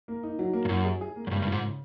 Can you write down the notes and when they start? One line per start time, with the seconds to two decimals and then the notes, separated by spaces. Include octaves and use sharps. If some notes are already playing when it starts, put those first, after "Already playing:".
0.08 A#3
0.23 D#4
0.39 F#3
0.53 A#3
0.65 G2
0.69 F#2 F#3
0.85 G#4
1.01 G#4
1.16 A#3
1.27 F#2
1.31 G2 C#3
1.42 G2
1.47 F3
1.52 G#2
1.62 C#3